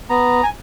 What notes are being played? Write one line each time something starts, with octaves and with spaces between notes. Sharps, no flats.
B3 A#5
G#5